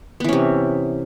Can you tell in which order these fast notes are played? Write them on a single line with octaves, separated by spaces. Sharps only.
B3 E3 C#4 C3